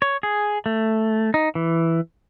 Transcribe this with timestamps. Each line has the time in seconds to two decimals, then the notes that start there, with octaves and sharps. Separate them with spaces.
0.02 C#5
0.23 G#4
0.66 A3
1.34 D#4
1.55 E3